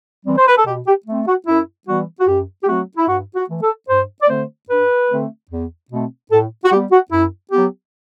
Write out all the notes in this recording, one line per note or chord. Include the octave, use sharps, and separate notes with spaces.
E3 G3 C4
C5
B4
A4
B2 G4
G4
A3
C4
F#4
F#2 E4
E3 G3 B3 F#4
F#4
F#2 G4
G4
F#3 A3 C4 F#4
E4
G2 F#4
F#4
E3 A3
A4
G2 C5
D5
D3 A3 C4 C5
G2 B4
D3 A3 C4
E2
B2 A3 C4
A2 A4
F#4
G3 B3 G4
F#4
F#2 E4
F#3 B3 G4